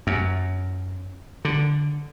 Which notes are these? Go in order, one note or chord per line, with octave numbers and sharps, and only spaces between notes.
F#2
D3